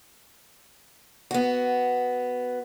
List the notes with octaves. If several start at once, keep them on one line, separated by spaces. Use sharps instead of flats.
B3 F#4